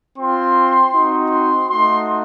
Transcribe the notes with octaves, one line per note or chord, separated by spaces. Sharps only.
C4 F4 C6
C4 D#4 F#4
C6
A3 D#4 F#4 C6